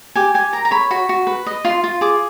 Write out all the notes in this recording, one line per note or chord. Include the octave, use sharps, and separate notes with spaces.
G4 G#5
G4 G#5
A#4 A#5
A#5
C#5 B5
F#4 B5
F#4
B4
D#5
F4 C6
F4
G#4 D6